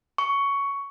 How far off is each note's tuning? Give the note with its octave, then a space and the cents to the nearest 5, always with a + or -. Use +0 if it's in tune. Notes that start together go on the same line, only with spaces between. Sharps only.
C#6 +10